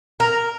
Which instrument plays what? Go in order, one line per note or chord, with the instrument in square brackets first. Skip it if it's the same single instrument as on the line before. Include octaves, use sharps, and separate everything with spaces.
[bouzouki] A#4 [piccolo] A#5